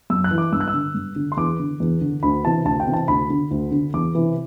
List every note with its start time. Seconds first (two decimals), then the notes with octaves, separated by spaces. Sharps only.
0.10 F#2 E6
0.24 F#6
0.31 E3
0.38 D6
0.52 G2 E6
0.60 F#6
0.68 E6
0.73 D3
0.94 G2
1.16 D3
1.32 C6
1.37 E2 D6
1.60 D3
1.80 E2
2.01 D3
2.23 D2 B5
2.44 C3 E3 A5
2.65 D2 A5
2.80 G5
2.87 C3 E3
2.93 A5
3.08 D2 B5
3.30 D3
3.51 D2
3.71 D3
3.94 E2 D6
4.15 C3 E3